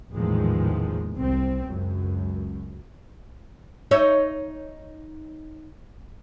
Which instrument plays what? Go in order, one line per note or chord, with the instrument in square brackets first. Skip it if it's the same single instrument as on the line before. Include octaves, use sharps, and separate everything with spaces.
[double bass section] A1 E2 A#2 D#3 F3 G#3
C2 C4
C#2 F#2
[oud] D#4 C#5 E5